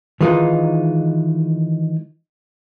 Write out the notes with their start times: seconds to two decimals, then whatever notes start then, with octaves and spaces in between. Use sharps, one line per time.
0.21 D#3 E3 G#3 D#4 F4